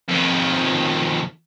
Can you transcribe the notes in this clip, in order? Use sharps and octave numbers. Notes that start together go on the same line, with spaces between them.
F2 D#3